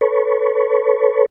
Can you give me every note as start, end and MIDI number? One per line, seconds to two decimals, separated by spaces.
0.01 1.26 69
0.01 1.26 71
0.01 1.26 73